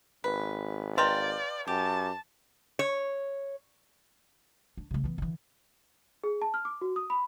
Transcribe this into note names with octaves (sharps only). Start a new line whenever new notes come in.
G#1 B4
B4 D5 D#5 F5 G5 A#5 C6
F#2 G4 A5
C#5
D4
C#3 G#3
E3 B3
D3 E3
G#4
A5
F6
D6
F#4
D#6
B5